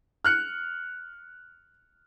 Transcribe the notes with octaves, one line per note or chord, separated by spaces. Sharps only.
F6 F#6 C#7